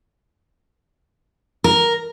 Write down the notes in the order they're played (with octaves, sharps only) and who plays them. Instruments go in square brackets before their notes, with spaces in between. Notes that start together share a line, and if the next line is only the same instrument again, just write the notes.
[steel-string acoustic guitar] A#4